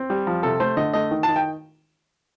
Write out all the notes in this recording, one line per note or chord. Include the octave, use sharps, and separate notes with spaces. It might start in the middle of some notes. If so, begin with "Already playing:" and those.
Already playing: C4
G3
F3
C3 A4
A3 C5
D3 D#5
A3 D#5
D#3
D#3 A5
G5